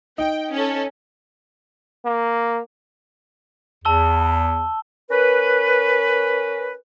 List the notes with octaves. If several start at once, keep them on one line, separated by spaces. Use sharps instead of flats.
D#4 G5
C#4 A4
A#3
E2 A5 E6 G7
C#4 A#4 B4